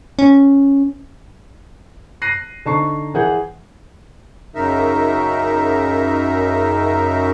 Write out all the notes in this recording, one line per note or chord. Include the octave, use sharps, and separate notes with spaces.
C#4
F#6 A#6 C7 D#7
D3 D#4 A5 A#5 C#6 C7
E3 G#4 F#5 G6
F#2 C#3 D#4 A#4 E5